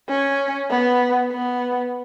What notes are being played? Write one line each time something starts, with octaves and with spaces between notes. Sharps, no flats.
C#4
B3
B3